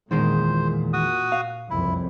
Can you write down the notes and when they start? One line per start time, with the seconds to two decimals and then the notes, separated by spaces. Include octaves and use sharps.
0.11 E2 A#2 D#3 G#3 C5
0.93 F#4 D#6
1.32 F5
1.70 F#1 C2 F2 E4